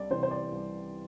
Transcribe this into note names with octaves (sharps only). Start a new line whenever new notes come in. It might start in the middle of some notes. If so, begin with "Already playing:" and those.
Already playing: C2 D5
C3 E3 C5
C5
D5
C2